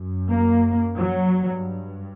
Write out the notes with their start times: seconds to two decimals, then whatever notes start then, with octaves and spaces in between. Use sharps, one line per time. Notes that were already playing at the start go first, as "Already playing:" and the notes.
Already playing: F#2
0.27 A#3
0.97 F#3
1.32 G2